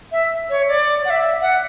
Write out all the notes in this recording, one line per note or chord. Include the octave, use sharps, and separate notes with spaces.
E5
C#5
D5
F#5
E5
F#5